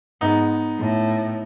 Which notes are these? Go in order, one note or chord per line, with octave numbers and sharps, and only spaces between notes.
G#2 B3 D#4
A2